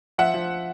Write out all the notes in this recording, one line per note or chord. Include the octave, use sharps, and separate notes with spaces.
F3 E5 F#5
F3